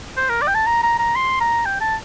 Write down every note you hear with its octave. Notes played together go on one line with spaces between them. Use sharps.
C5
A#4
D5
G5
A5
A#5
A#5
A#5
C6
A#5
G5
A5